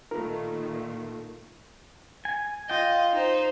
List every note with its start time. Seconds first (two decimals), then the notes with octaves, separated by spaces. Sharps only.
0.11 A#2 D#3 A3 D#4 F4 A4 A#4
2.25 G#5
2.70 F4 D#5 G5
3.12 D#4 C5